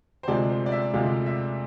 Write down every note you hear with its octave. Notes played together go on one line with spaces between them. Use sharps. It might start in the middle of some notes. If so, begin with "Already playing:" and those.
C5
D2 C3 F3 G#3 D5
C5
D5
E5
D2 C3 F3 G#3 F5
E5